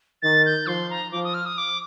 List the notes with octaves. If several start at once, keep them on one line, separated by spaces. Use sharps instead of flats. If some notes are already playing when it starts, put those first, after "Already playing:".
D#3 A6
G6
F3 C6
A#5
F3 D6
D#6
F6
D#6
D6